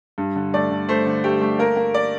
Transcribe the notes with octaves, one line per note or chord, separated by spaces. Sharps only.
G2
D3
A3 D5
D3
A3 C5
D3
A3 G4
A3
A#3 A#4
A#3
D5